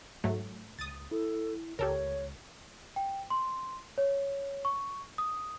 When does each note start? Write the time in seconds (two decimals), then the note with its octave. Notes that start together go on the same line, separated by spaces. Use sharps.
0.24 G#2 F#3 A3
0.79 C#2 D#6 A6
1.11 E4 A4
1.79 C#2 G4 A4 A#4 C#5
2.96 G5
3.30 C6
3.98 C#5
4.65 C#6
5.18 D#6